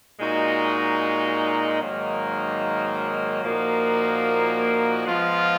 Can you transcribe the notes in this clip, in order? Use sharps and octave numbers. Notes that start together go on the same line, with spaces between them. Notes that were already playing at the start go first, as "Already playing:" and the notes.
A#2 G#3 D#4 F#4
G#2 D#3 F#3 A#3
A#2 F3 A#3 D#4 F#4
F3 G#3 B3 F4